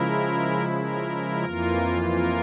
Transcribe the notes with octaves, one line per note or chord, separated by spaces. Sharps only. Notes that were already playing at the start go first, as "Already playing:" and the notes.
Already playing: C#3 F3 G#3 E4 A#4
A#4
F2 E3 A#3 F4
A#4